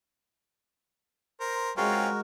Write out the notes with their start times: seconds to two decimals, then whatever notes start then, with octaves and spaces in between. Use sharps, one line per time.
1.40 A#4 C5
1.77 G#3 C4 C#4 F4 F#4 A#4